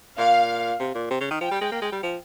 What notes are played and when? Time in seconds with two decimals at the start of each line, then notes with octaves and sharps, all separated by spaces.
0.18 A#2 F5
0.80 C3
0.95 A#2
1.10 C3
1.21 C#3
1.31 D#3
1.41 F3 G5
1.51 G3
1.61 G#3
1.72 A#3
1.82 G#3
1.92 G3
2.03 F3